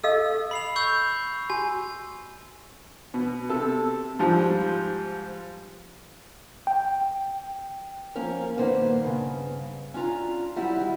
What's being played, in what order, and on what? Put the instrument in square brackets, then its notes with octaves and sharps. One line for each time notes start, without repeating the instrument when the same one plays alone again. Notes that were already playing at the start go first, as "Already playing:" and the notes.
[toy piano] A4 D#5 F5 [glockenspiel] E6
[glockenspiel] B5 C7 F7
C#6 E6 G6
[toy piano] F#4 [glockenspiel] G#5
[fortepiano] B2
C3 A4
G#2 F3 G3
[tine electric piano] G5
[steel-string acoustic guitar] F3 A#3 C#4 A#4
G2 A#2 D#3 A#3 B3 C5
G2 C#3
C#4 D4 F4 A#5
F#3 G3 E4 F#4
D#3